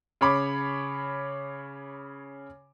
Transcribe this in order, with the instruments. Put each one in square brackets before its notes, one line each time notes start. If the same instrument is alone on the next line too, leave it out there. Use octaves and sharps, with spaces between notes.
[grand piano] C#3 C#5 B5 D6